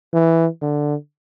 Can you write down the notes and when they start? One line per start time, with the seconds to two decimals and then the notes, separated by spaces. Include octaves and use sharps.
0.13 E3
0.62 D3